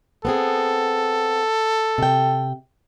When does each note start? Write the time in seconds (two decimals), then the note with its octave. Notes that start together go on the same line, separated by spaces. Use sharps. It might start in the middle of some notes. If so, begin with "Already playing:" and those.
0.25 B3 C4 G#4 A4
1.98 C3 G5